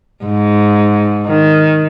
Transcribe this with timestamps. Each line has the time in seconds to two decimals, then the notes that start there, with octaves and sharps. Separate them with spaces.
0.25 G#2
1.27 D#3